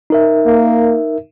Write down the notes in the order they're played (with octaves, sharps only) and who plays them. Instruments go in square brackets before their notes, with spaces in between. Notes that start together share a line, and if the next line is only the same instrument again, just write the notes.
[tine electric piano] D#4 A#4 E5
[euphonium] A#3